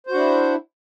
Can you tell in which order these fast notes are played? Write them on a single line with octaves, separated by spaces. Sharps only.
C5 F#4 D4 E4